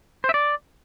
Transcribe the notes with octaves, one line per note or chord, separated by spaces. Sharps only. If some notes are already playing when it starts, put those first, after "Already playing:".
C5
E5
D5